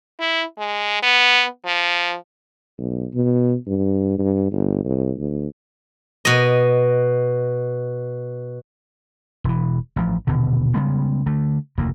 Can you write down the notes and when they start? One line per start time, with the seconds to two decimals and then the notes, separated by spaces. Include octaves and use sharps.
0.20 E4
0.58 G#3
1.03 B3
1.66 F3
2.78 B1
3.14 B2
3.67 G2
4.18 G2
4.52 G1
4.84 C2
5.17 D2
6.25 B2 D#5
9.44 E1 E3
9.96 A1 F3
10.27 D#1 B2 D3
10.74 C#3 G3 G#3 B3
11.26 D3 A3
11.78 F1 D2 A#3